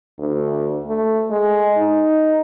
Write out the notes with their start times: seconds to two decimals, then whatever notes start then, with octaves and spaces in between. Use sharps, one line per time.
0.19 D2
0.86 A3
1.31 G#3
1.78 D#4